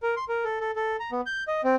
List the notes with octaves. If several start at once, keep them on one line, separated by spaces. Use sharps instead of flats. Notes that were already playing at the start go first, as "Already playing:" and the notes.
A#4
C6
A#4
A4
A4
A4
A#5
B3
G6
D#5
C4